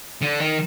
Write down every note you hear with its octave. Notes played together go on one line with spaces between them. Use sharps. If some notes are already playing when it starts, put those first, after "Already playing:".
D3
D#3